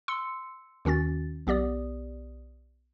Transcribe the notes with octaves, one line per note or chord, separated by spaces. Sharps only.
C6 E6 C#7
D#2 D#3 C#4 F#4 A6
B1 B3 G4 D5 D#6